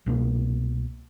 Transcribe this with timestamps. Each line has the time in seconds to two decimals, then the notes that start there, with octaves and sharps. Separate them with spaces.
0.06 C2 B2 D#3 A#3